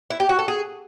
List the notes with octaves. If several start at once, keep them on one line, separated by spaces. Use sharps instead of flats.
E4
G4
F#4
A4
G#4